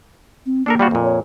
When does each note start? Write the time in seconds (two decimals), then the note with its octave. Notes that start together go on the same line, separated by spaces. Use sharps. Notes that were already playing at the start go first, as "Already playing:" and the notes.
0.46 C4
0.66 A#3 D4 A4 A#4
0.79 G3 F4 F#4
0.91 F2 A#2
1.03 C#5